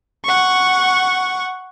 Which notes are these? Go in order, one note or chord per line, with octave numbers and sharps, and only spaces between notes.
F#5 C#6